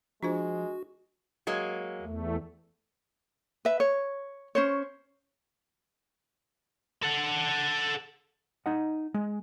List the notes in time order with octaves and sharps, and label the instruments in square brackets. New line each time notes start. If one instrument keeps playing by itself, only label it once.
[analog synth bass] F3 [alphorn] G#3 [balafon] D4 F4 C5 [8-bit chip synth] F#4
[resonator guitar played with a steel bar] F#3 G#3 A#3
[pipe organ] E2 A3
[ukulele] B4 E5
C#5
C#4 C5 C#5
[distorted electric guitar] A4 F#5
[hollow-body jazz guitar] D#4 D#5 F#5
G#3